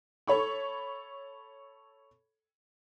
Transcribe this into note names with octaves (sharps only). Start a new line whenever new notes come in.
A4 C#5 B5 C#6